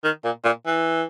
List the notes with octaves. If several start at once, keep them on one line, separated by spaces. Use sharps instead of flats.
D#3
A#2
A#2
E3